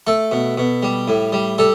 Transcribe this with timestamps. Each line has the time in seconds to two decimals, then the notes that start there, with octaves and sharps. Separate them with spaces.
0.07 A3 A4
0.32 B2
0.58 B2
0.83 G3
1.08 A2
1.33 G3
1.58 G3 A4